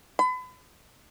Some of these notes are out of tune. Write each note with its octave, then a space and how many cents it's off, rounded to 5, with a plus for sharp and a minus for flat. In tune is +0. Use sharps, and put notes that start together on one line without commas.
B5 +35